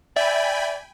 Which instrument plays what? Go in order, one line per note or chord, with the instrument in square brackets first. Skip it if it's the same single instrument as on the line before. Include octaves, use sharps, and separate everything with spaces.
[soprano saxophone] D5 [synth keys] E5 [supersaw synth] G5 G#5 B5